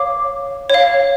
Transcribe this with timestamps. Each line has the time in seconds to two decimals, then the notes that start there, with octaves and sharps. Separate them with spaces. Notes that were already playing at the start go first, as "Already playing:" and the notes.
Already playing: C#5 F5 D6
0.70 C#5 F5